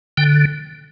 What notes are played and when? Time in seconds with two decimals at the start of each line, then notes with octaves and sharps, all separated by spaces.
0.17 D3 G5